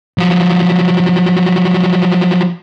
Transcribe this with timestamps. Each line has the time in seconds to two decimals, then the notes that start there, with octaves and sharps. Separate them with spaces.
0.18 F3 F#3